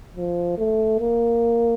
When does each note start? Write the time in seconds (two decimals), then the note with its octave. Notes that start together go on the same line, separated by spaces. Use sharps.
0.17 F3
0.58 A3
1.00 A#3